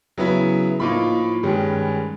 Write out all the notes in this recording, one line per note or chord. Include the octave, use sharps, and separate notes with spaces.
C#3 F#3 B3 E4
A2 F3 A#3 D#4 B5
G2 D#3 G#3 C#4